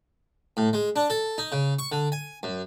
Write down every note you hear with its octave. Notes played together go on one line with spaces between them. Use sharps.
A2
G#3
D4
A4
D#4
C#3
C#6
D3
G#5
F#2